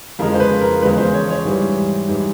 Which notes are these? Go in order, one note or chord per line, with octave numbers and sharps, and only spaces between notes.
F2 C#3 F3 G#3 A#4
C5
B4
A#4
E2 C#3 F3 G#3 B4
C5
C#5
C#5
G#2 E3 G3
G#2 E3 G3